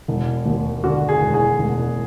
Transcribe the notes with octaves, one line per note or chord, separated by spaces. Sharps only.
E1
D#2
D3 F#4
G#4
E1
G#4
E1